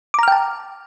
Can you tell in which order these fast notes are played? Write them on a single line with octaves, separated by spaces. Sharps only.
D6 A#5 F6 G5 A5